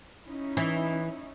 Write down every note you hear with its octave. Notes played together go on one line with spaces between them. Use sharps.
C#4 D#4 E4
E3